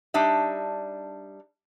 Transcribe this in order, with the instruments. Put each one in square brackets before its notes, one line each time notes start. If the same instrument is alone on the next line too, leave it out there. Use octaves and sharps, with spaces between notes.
[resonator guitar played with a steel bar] G3 D4 D#4 E5